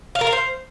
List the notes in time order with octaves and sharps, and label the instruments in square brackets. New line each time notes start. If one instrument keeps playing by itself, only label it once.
[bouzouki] F5
A#4
F5
C5